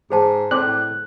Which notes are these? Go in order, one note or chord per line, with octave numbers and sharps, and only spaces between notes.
G#2 G#4 C5 A5
A2 C4 D5 F#6